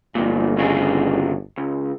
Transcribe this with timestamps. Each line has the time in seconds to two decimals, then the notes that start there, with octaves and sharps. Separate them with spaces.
0.15 G1 F2 A#2
0.57 D#2 C#3 G#4
1.57 C#2